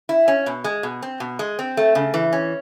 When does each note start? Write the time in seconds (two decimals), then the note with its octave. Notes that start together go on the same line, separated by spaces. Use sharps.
0.09 E4
0.28 C#4
0.46 B2
0.64 G#3
0.83 B2
1.02 C4
1.20 B2
1.39 G#3
1.59 C4
1.77 A3
1.95 C#3
2.14 E3
2.33 C#4